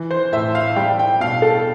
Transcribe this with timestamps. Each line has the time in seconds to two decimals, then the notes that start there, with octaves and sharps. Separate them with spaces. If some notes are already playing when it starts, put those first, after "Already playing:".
Already playing: E3
0.11 C5
0.32 A2 E5
0.55 F5
0.76 G3 G5
0.99 G5
1.20 B2 F5
1.42 A4